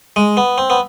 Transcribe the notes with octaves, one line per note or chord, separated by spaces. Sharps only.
G#3
B3
C4
B3